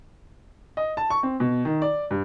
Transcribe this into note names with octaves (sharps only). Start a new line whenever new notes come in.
D#5
A5
C#6
C4
B2
D#3
D5
G2